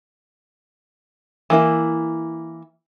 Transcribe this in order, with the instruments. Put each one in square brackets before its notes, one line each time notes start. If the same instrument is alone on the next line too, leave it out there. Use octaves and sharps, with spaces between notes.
[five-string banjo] E3 A#3 E4